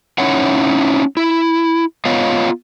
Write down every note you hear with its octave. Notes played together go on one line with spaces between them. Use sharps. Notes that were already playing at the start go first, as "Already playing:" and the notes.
C#4 D#4 E4 C#5 F#5
E4
B3 F4 C#5 D#5 F5